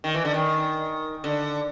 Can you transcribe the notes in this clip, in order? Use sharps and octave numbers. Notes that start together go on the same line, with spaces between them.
D#3
E3
D3
D#3
D3